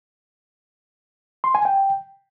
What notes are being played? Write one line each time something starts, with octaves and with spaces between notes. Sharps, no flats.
C6
G#5
G5